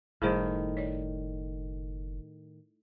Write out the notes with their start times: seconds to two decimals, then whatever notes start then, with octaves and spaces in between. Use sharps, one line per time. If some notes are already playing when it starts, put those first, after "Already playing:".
0.22 F#1 A2 D#3 G3 G#4 C5
0.77 C#5 D5